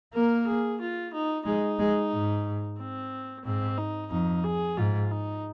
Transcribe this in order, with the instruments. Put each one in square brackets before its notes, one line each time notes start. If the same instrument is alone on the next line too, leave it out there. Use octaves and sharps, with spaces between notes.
[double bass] A#3 [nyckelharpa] A#4
[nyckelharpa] G#4
F4
D#4
[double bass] G#3 [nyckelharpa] D#4
[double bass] G#3
G#2
[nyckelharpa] C4
[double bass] G#2 [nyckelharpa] C4
[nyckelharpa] D#4
[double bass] F2 [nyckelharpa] D#4
[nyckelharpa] G#4
[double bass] G#2 [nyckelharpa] F4
[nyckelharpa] D#4